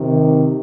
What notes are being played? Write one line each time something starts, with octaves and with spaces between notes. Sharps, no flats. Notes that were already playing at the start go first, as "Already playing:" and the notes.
Already playing: C3 D#3